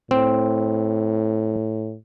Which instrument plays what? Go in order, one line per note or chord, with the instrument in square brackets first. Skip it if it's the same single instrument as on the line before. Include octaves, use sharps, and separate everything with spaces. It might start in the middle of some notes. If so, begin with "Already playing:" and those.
[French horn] A2 [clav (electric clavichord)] C4